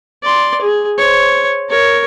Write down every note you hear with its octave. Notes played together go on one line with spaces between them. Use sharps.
D5 C6
G#4
C5 C#5
A#4 C#5